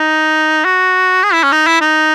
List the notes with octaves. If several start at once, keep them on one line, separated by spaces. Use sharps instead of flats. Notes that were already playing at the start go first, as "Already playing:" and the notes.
Already playing: D#4
F#4
G#4
E4
C#4
D#4
E4
D#4